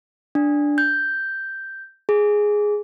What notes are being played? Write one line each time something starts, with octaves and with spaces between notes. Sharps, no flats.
D4
G6
G#4